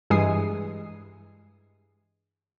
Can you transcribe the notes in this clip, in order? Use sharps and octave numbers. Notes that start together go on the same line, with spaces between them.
G2 E3 G#3 G#5 D#6 C7